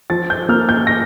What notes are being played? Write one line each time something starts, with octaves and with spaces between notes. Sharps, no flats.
F3 A6
G6
A#3 F6
G6
A#6